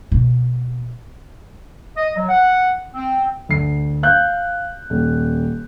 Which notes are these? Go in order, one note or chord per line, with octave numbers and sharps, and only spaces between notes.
B2
D#5
F#3
F#5
C4
D2 C7
F5 F#6 G6
D#1